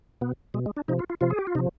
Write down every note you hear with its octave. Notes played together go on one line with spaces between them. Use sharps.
B2 B3
B2 G#3
G#3
D4
C3 F3 D#4
F4
F4
C3 F3 F4
G#4
G4
F4
C3 F3 D#4